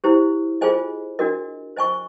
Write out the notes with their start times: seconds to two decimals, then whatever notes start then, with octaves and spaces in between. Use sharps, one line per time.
0.04 E4 G4 C5
0.61 F4 G#4 C5 D#5 G#5
1.19 D4 F#4 A#4 D#5
1.76 C5 D#5 G#5 C#6